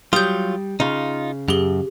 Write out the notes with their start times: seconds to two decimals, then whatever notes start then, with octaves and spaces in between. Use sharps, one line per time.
0.13 F#3 G3 F4 D#6 G6
0.80 C#3 D#4 F4
1.48 F#2 G4 G#4 G7